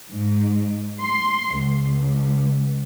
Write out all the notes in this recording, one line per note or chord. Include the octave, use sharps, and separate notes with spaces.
G#2
C6
C#2